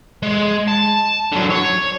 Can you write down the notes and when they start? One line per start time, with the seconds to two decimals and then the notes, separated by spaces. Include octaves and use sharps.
0.23 G#3
0.68 A5
1.32 D3 F#3
1.51 C#5